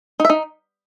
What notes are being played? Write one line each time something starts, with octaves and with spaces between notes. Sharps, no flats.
D#4
E5
D#4